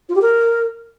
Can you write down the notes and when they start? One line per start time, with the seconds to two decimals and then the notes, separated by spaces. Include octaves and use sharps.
0.09 F4
0.15 G4
0.21 A#4